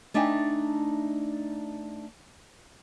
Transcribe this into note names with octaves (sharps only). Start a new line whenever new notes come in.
A3 D4 D#4 E5 G5 G#5